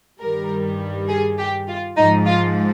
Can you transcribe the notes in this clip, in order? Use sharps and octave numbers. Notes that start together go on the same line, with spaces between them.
G2 D#3 G3 A#4
G#4
G4
F4
G#2 F3 D#4
F4